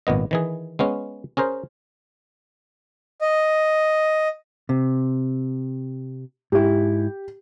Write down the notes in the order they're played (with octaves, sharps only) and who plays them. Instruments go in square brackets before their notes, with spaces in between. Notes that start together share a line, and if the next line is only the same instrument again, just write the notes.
[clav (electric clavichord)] G#1 A#2 B3 D#5
D#3 E3 G#4
G#3 B3 C#4
C#4 G#4 A#4 C5
[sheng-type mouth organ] D#5
[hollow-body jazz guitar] C3
[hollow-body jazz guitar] G#2 E4 [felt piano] G4